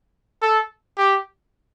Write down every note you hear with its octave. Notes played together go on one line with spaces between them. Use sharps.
A4
G4